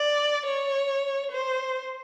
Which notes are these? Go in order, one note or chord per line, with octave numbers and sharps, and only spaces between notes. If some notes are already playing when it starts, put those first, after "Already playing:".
Already playing: D5
C#5
C5